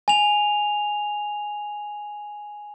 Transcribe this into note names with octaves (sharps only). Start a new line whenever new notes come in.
G#5 F7